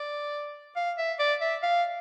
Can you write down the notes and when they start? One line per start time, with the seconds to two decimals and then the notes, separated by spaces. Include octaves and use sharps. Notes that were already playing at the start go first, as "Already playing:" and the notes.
Already playing: D5
0.76 F5
0.98 E5
1.19 D5
1.41 E5
1.63 F5